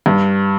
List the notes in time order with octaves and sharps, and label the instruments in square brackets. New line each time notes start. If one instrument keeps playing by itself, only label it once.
[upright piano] G2